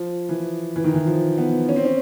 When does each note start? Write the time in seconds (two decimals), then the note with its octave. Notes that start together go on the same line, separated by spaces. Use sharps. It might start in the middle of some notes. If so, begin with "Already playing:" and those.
Already playing: F3
0.29 E3
0.76 E3
0.84 D#3
0.94 E3
1.07 F3
1.38 B3
1.69 C#4
1.76 C4
1.85 C#4